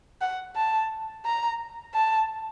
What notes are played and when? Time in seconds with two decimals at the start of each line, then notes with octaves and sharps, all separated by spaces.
0.21 F#5
0.56 A5
1.26 A#5
1.94 A5